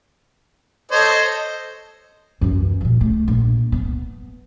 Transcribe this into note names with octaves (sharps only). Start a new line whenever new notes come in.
A4 C5 C#5 D#5
F#2 E3
A#2 F3
A3
A#1
B3